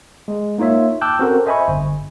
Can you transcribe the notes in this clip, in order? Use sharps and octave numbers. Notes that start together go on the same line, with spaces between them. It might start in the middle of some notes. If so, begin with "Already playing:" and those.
G#3
A#3 D#4 F4 C#5 E5
G5 A5 D6 E6 F#6 G6
C4 C#4 F#4 A4 A#4 C5
C5 D#5 E5 G#5 B5 C#6
G1